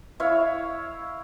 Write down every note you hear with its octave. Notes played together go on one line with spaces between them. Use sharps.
E4 C#5 F5